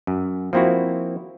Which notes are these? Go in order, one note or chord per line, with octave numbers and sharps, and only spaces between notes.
F#2
F3 A#3 C4 E4 F#4